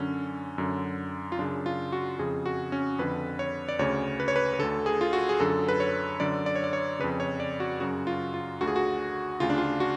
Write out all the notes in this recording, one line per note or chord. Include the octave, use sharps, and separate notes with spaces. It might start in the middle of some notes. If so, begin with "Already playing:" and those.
Already playing: F#2 D3 C#4
F#2 D3
F4
F#2 C#3 D4
F4
F#4
F2 C#3 G#4
F#4
C#4
F2 D3 B4
C#5
D5
D2 C#3 C#5
B4
C#5
B4
B4
D2 D3 A4
G#4
F4
F#4
G#4
F#2 D3 A4
B4
C#5
F#2 D3 D5
D5
C#5
D5
C#5
F2 C#3 B4
C#5
D5
F#4
F#2 C#3 F#4
F4
F4
D2 D3 F#4
G#4
F#4
D2 C#3 F4
D4
F4
F#4